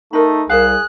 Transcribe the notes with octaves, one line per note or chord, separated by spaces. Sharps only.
A3 D#4 A#4 B5
C2 G#4 A#4 C5 F5 F#6